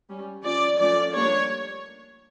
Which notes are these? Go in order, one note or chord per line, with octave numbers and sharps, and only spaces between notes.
G3 C#4
F3 C#4 D5
F3 A3 C#4 D5
G3 A#3 D4 C#5